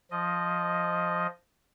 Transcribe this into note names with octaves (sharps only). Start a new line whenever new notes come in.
F3 D#5